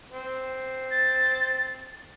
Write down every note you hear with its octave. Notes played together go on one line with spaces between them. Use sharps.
C4
A6